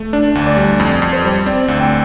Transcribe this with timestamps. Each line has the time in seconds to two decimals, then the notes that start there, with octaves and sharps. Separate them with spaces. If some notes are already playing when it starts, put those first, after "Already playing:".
Already playing: A3
0.13 D4 D5
0.35 D2
0.46 D5
0.57 G3
0.80 F2 D5
1.02 F2
1.13 C5
1.24 G3
1.46 C4 D5
1.68 D2
1.80 D5 G5